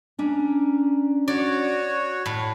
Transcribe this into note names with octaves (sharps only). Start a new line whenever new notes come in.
C#4 D4 A#5
F#4 C#5 D5
A2